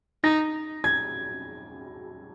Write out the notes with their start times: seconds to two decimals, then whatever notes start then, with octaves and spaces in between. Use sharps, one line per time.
0.24 D#4 A#6
0.84 G#6